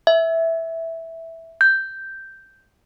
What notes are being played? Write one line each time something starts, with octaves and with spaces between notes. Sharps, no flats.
E5
G6